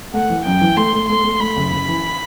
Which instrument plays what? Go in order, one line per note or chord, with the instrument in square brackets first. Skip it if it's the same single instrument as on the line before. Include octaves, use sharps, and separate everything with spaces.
[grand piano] A3 [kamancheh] F#5
[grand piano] E3
[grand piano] F#2 [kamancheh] G5
[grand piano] E3
[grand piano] A3 [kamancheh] C6
[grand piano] A3
[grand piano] A3 [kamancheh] C6
[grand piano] A3
[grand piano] A3 [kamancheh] B5
[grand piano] F#1
F#1
E3